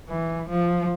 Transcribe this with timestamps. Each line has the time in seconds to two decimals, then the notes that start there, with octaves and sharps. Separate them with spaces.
0.09 E3
0.49 F3